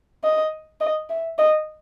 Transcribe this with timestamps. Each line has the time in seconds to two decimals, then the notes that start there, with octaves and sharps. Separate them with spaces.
0.24 D#5
0.81 D#5
1.10 E5
1.38 D#5